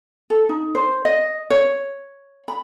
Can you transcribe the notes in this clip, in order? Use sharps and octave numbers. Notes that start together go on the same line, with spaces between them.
A4
D#4
C5
D#5
C#5
B5